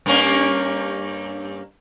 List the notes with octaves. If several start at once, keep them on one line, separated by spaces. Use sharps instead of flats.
G2 A#3 C#4